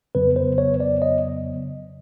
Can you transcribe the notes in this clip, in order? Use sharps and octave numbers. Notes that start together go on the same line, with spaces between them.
F2 C#3 F#3 B3 B4
C5
C#5
D5
D#5